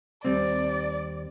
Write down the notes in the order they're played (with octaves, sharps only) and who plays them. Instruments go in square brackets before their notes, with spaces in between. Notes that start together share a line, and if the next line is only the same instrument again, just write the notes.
[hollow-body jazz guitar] D#2 G3 C4 [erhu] D5